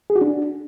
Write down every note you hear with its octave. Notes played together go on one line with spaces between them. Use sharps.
G#4
F#4
D4